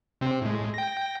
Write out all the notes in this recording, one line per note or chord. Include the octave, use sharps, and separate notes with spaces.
C3 C4
A2 G#3
G5 A#6